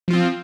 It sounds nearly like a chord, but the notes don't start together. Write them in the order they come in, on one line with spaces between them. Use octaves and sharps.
F3 F4 C4